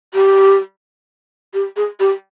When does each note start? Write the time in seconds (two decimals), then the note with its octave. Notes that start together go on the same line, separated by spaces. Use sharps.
0.14 G4
1.54 G4
1.76 G#4
2.00 G4